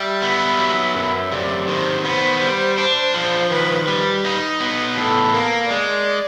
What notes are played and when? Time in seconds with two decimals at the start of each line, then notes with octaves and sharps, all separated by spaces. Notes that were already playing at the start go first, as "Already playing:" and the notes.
Already playing: G3 E5
0.22 B3
0.59 F#3
0.95 F#2
1.32 C3 D5
1.68 D#3 C5
2.05 B3 C5
2.41 G3
2.78 D4
3.14 F3
3.51 D#3 B4
3.87 G3
4.24 D#4
4.60 B3
4.97 A2 A4
5.34 A#3 A#4
5.70 G#3 D5